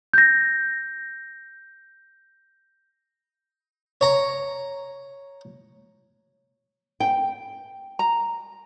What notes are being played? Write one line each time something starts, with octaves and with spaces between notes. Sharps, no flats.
G6 A#6
C#5 A#5
G5
A#5